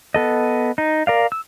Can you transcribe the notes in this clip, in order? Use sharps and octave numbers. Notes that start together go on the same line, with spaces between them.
B3 A4 D#5
D#4
A#4 D5 F5
E6